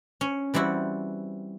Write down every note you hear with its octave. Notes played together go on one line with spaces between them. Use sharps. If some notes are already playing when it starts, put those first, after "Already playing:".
C#4
E3 G3 C4 E4 F#4